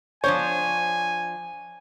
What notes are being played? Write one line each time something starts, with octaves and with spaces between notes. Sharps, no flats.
F3 D4 C5 C#5 G#5